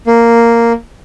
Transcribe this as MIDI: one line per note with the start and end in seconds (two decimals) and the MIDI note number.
0.07 0.72 58